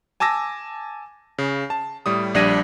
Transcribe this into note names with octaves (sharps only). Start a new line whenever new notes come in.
G#5 A5 D6 E6 A#6
C#3
A5
A2 G3 D#6
A#1 G3 D4 G#6 A#6 D#7